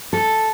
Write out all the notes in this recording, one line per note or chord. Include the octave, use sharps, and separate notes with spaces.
A4